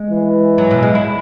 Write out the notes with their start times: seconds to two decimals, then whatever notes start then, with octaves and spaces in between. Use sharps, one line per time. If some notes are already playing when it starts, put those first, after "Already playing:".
Already playing: G#3
0.10 E3
0.58 F#3
0.71 B2
0.83 G#3
0.95 E4